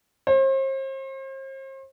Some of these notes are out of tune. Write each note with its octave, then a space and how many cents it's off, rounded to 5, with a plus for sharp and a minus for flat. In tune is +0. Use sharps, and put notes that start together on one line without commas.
C5 +40